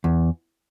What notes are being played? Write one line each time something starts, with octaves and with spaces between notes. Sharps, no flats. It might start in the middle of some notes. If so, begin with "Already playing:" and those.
E2